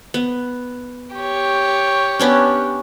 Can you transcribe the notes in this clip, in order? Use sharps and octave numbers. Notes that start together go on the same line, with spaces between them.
B3
G4 C#5
B3 C#4 D4